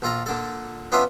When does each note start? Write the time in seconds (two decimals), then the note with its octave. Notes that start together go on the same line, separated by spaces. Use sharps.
0.02 A#1 F4 A4 A#5
0.26 A#2 D3 A4
0.92 B3 C#4 D4 F4 C5 E5